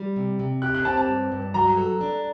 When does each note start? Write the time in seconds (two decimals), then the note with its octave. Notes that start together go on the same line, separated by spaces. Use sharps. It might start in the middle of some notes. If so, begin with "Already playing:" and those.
Already playing: G3
0.16 C3
0.39 C3
0.62 G4 F#6
0.75 F#6
0.85 C4 A5
0.97 A5
1.08 G2
1.32 G2
1.54 F#3 A#5
1.77 A4
2.01 D4